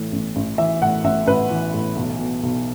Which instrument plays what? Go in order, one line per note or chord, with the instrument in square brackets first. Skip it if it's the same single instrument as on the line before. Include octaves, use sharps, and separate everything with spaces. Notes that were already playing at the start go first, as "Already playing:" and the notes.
Already playing: [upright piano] A2 E3
A1
A1
E3 E5
A2 F#5
A1 E5
A1 B4
E3
A2
B1
B2
B1